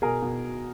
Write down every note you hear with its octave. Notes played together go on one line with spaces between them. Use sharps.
B2 G#4 A#4
B2